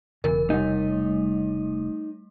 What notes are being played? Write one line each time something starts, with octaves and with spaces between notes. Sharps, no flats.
E1 C#3 E3 A#4
C3 G3 A3 D#4